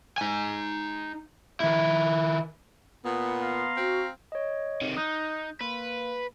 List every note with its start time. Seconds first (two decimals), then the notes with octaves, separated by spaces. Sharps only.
0.18 D#4 G#5
1.60 D#3 E4
3.05 A#2 B3
3.41 F5 A#5 C6
3.77 C4 F#4
4.32 C#5 D#5
4.81 C3 D#3
4.97 D#4 D#6 F#6 G6
5.61 A#3 B4